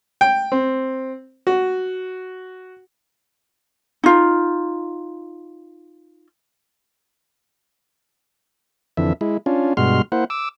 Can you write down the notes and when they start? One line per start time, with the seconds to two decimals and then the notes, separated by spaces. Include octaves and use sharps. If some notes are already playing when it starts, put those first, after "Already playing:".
0.21 G5
0.52 C4
1.47 F#4
4.04 D#4 F4
8.97 F2 D3 E3 E5
9.21 G#3 E4
9.46 C#4 D4 F4
9.77 G2 B2 G#3 F#4 C6 F6
10.12 A#3 E4 C5 F#5
10.30 D6 E6